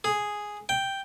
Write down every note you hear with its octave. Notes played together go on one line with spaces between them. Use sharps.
G#4
G5